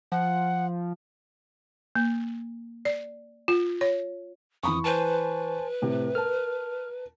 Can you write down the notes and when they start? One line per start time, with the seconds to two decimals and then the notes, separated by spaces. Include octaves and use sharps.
0.12 F3 F#5
1.96 A#3
2.85 D5
3.48 F4
3.81 C#5
4.63 F2 E3 B5 C#6 D#6
4.84 B4 C5 G#5 A5
5.82 A2 C3
6.15 A#4 A5 F6